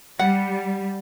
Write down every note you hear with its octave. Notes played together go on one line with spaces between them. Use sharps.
G3 F#5